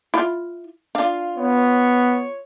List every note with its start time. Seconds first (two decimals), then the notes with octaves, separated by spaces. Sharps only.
0.14 E4 F4
0.95 D4 F4 F5
1.38 B3 C#5